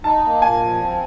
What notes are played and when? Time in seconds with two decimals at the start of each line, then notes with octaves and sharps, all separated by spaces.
0.04 D#4 A5
0.24 A#3
0.42 A#2 G#5
0.62 F3
0.80 C4